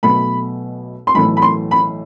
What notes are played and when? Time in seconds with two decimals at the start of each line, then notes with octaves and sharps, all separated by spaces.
0.03 B1 B2 A3 B5
1.07 C6
1.15 B1 A2 E3 A3 B5
1.37 B5
1.42 C6
1.71 B5